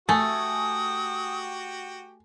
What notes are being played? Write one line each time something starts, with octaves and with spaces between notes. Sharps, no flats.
A3 F#4 G4 G#5 D#6